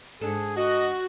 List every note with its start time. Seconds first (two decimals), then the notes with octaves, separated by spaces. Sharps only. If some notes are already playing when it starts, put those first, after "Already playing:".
0.21 G#2 D4 G#4 A4
0.57 F#4 D#5